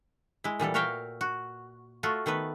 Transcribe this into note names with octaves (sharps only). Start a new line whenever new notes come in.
G#3 E4
A#2 E3 G3 A4
F#4 A#4 C#5 E5 F5 G5
F#4
A3 F4 F#4
D#3 A3 B3 B4